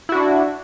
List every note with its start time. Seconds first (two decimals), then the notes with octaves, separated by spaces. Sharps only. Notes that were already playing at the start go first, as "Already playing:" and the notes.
0.09 E4
0.12 F#4
0.15 D4